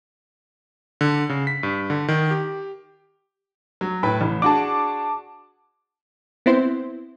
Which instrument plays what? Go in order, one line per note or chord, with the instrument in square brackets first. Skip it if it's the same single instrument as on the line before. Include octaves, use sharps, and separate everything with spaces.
[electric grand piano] D3
C#3
B6
G2
D3
D#3
G4
[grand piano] F#3
[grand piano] A2 B4 G5 [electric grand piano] B5
[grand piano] A1
[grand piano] D4 F#4 G#4 [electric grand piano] A5 D6
[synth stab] B3 C4 E4 C5